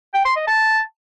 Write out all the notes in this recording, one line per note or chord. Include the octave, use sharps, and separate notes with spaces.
G5
C6
D#5
A5